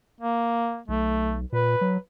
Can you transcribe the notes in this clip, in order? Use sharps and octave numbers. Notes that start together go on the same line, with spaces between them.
A#3
B1 A3
A#2 B4
F#3